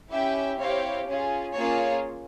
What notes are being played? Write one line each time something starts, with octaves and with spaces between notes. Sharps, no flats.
C#4 E4 G4 E5 G5
C4 E4 G4 C#5 F5
C#4 F4 G#4
A#3 C#4 F4 G#4 C#5